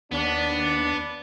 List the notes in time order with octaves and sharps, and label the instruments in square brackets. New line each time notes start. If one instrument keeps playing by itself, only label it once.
[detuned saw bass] D#2 [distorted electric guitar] B3 [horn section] D4